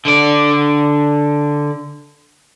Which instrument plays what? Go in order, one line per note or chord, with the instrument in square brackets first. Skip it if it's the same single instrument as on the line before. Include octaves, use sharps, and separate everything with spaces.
[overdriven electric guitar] D3 D5